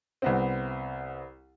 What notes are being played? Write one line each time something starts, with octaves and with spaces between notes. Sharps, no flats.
C2 B3 C4